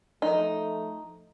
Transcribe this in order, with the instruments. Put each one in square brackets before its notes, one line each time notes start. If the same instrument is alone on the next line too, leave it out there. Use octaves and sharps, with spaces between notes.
[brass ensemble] F3 A3 [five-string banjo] D#4